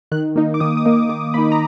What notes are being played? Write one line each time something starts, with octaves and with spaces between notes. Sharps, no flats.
D#3 F#6
A#3 D#4
D6
D#3 D#6
D#6
A#3 D#4
D6
D#3 D6
A#3 D#4 B5
A#5